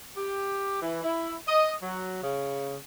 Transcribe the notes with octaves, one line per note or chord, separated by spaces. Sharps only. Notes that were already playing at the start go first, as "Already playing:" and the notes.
G4
E3
E4
D#5
F#3
C#3